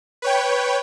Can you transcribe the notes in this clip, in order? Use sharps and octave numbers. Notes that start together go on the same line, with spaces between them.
B4 C#5 G5